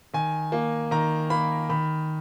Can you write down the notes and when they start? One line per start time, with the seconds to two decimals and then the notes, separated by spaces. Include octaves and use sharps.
0.14 D#3 G#5
0.52 A#3
0.91 D#3 A#5
1.30 A#3 B5
1.69 D#3 B5